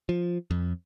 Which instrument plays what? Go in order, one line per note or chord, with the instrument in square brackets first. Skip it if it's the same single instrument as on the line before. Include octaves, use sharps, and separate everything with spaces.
[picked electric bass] F3
F2